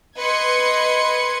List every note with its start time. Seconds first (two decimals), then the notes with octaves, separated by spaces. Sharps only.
0.17 B4 D#5 C6 G#6 C#7